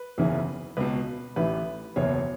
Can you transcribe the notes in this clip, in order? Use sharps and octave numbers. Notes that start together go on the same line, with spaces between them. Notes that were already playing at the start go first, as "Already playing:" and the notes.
Already playing: B4
F#1 E2 C#3 E3
C#2 B2 B4
A1 A2 E3 B4
F#1 E2 B2 C#5